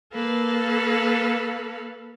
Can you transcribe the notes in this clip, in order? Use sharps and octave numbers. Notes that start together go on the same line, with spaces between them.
A#3 A4 B4 F5